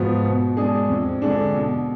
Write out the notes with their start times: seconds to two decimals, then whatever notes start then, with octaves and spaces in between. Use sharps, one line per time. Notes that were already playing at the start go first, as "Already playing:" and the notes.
Already playing: G#2 F3 B3 F#4
0.25 B2
0.57 G#3 D4 G#4
0.89 F2
1.22 D3 G#3 D4
1.54 B2